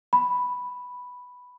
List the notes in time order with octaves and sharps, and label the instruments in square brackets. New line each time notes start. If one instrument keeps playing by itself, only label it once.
[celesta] B5